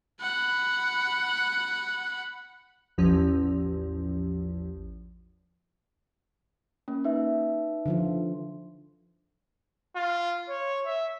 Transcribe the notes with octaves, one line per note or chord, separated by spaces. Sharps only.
F#5 B5
A1 E2 F3 C#4
A#3 C#4
D#4 B4 E5
D3 F3 F4
F4
C#5
E5